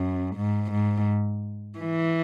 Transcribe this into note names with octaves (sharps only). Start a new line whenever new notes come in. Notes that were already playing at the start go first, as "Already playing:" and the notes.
Already playing: F#2
G#2
G#2
E3